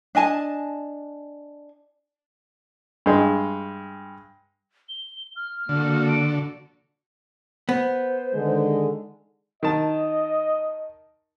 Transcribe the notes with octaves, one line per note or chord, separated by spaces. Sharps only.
D4 D#5 G#5 A5
G2 G#3
G7
F6
D3 A#3 F#4 A4
D7
B3 C5
D3 D#3 G#3
D#3 D#5 A5